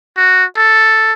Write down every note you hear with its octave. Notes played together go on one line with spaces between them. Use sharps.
F#4
A4